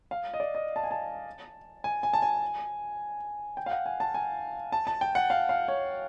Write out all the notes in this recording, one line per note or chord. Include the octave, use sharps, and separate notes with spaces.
F5
D#5
D5
D#5
A5
G#5
A5
G#5
G#5
A5
G#5
G5
F5
F#5
G#5
A5
G#5
A5
A5
G5
F#5
F5
F5
C#5